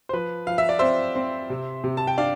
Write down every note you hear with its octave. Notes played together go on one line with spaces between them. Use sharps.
C5
F3 B4
F3 F5
E5
D5
C4 C5 E5
C4
C3
C3
A5
G5
D4 D5 F5